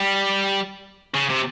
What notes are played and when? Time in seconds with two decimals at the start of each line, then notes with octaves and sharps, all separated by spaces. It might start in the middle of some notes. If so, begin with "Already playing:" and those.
Already playing: G3
1.15 C#3
1.30 C3